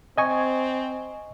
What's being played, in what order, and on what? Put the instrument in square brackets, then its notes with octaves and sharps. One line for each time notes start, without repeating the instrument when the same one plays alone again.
[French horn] C4 [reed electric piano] D#5 G#5 C#6